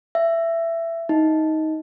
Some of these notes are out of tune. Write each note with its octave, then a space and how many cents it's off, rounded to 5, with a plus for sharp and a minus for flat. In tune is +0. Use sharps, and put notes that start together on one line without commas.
E5 +15
D#4 +15